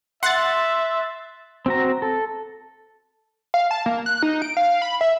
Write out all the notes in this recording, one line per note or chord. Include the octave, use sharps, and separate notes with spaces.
E5 F#5 C6 F#6 A6
C4 F#4 A#5
A4
F5
A5
A#3
F#6
D#4
D7
F5
B5
E5